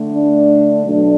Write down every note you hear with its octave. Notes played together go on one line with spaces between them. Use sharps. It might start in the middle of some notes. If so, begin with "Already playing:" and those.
Already playing: D3 A3
D4
B2 F#3 A3 D4